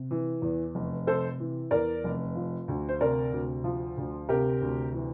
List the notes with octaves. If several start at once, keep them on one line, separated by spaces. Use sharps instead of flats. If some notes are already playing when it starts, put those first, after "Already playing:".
Already playing: C3
E3
E2
F1
C3 A4 C5
E3
E2 A#4 D5
F1
F3
D2
C5
C3 A#4 D5
D2
F3
D2
C3 G4 A#4
D2
E3